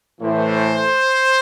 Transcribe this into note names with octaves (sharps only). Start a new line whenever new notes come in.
A2 E3 A3 C5